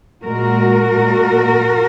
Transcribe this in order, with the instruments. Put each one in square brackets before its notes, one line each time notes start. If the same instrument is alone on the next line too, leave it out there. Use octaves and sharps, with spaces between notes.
[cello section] A#2 G#3 F#4 A#4
A#2 G#3